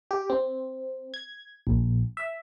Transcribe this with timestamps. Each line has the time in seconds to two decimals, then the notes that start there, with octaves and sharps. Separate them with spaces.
0.11 G4
0.30 C4
1.14 G#6
1.67 A#1
2.17 E5